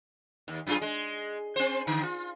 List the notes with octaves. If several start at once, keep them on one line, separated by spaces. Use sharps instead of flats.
D#2
F#2 F4 G#4
G#3
C4 C5
D3
F4